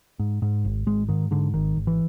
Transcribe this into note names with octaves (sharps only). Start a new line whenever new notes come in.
G#2
G#2
G#1
G#1 G#3
G#2 D#3
G#2 D3
G#1 D#3
G#1
E3